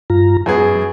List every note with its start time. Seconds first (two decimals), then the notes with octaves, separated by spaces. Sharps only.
0.10 G2 F4 A#5
0.46 F#2 F#3 B3 G#4